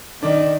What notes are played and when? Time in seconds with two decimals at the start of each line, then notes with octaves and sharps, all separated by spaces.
0.22 D#3 D4
0.37 D4